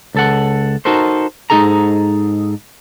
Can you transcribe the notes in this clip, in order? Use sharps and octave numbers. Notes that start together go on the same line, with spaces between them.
C#2 A4 F#5
D#4 F#4 A4 A#4 C5
G#2 D3 D#4 G#4 A4 A#5